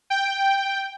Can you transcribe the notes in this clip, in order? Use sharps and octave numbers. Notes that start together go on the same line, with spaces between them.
G5